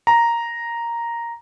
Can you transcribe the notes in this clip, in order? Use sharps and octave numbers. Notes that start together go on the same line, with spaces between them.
A#5